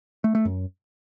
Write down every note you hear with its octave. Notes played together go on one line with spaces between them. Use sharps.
A3
A3
F#2